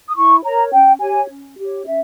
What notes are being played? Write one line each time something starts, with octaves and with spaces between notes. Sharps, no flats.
D#6
E4 C#6
A#4 C#5 A#5
C#4 G5
G4 C#5 G#5
C#4
G4 C#5
C#4 E5